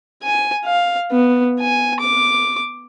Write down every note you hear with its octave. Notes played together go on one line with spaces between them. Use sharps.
G#5
F5
B3
G#5
D6